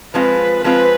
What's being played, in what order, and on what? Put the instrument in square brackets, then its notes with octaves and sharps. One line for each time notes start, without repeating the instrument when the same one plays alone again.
[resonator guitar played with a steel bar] F3 G#3 C4 F4 [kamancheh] B4
[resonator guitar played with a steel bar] F3 G#3 C4 F4 [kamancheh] B4